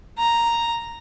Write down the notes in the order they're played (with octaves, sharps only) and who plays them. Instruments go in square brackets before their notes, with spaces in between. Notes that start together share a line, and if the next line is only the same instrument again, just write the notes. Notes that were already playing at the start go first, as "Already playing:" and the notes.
[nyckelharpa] A#5